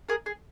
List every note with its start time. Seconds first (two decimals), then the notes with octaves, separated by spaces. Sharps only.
0.09 G#4 A#4
0.26 G#4